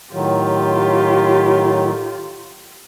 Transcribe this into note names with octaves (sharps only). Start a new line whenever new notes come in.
A2 D#3 F#3 F4 G4